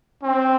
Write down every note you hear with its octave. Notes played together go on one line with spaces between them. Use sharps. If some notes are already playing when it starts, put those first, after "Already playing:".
C4